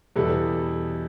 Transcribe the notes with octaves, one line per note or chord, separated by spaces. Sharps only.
E2 B2 G3 E4 A4